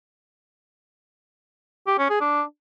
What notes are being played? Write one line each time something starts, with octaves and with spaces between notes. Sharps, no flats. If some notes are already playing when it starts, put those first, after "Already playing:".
G4
C#4
G#4
D4